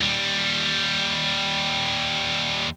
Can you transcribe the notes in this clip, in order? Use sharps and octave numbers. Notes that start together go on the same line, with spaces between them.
D#2 G3